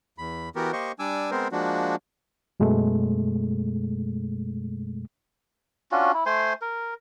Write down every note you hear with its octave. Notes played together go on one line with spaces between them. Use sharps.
E2 B5
E3 B3 F#4 G4 A#4
A#3 G4 C5 D#5 C#6
G3 D4 G#5 D6 E6
G#3 B3 C4 A#4 C5
F3 G#3 A#3 D4 F#4
F#2 B2 G#3 A3
C#4 D4 F4 F#4
E4
A3 C5 G#5 C6
A#4